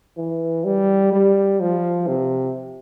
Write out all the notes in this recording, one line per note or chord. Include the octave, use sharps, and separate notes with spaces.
E3
G3
G3
F3
C3